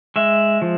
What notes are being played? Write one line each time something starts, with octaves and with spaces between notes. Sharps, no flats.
G#3 E5
F3